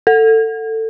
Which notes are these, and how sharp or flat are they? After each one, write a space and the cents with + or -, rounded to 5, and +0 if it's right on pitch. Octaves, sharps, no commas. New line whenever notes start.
A4 +20